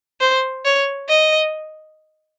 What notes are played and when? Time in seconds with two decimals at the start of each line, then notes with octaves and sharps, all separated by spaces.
0.20 C5
0.65 C#5
1.08 D#5